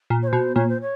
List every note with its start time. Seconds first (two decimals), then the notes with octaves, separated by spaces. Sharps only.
0.10 A#2
0.22 C#5
0.27 C5
0.33 B2
0.55 A#2 C#5
0.68 C5
0.81 C#5